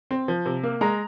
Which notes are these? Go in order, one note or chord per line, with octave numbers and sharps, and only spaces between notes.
C4
F3
C3
A#3
G#3 A#5